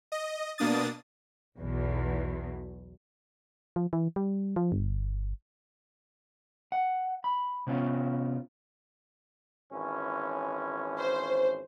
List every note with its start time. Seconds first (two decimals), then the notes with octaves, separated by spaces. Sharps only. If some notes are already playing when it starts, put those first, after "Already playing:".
0.12 D#5
0.58 B2 A#3 D4 D#6 A6
1.59 B1 E2 B2
3.76 F3
3.93 E3
4.16 G3
4.56 F3
4.72 G1
6.72 F#5
7.24 B5
7.67 C3 B3 C#4 F4
9.72 G#1 E3 C#4
10.98 C5